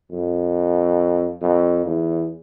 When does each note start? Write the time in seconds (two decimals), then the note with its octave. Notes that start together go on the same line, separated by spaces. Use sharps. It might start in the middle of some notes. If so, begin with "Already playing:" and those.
0.12 F2
1.42 F2
1.86 E2